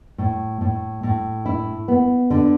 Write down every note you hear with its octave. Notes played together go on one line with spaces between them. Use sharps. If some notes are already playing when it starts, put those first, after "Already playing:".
A2
A2
A2
E4
B3
D3